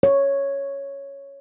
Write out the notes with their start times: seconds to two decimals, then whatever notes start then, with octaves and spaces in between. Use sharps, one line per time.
0.03 C#5